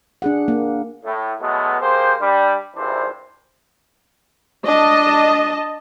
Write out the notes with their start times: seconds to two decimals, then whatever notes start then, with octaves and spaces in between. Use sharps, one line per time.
0.22 D4 G#4 F#5
0.48 A#3
1.04 A2
1.41 B2 F#3 G#3 A3 B3
1.81 A#3 G4 G#4 C5
2.21 G3 D4
2.75 G#1 G2 C3 E3 D4 C5
4.66 D4 D#5 A5